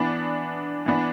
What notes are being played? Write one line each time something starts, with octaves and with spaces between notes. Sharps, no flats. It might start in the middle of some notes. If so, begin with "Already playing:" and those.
Already playing: E3 B3 D4
E3 B3 D4